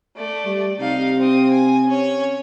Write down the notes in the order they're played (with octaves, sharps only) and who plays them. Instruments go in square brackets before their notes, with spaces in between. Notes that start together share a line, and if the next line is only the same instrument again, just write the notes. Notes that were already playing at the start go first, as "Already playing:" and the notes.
[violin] A3 D5
[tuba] G3
[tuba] C3 [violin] D#4 F5
[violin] C4 D#6
G#5
C#4 C#5